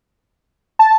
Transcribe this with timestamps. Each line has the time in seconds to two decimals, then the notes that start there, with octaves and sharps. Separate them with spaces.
0.79 A5